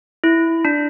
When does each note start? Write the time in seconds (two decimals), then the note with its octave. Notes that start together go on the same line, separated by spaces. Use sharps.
0.24 E4
0.65 D4